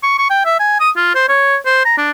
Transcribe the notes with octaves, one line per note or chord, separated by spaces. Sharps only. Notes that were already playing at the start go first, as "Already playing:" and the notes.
C#6
C#6
G5
E5
G#5
D#6
F4
C5
C#5
C5
A#5
D4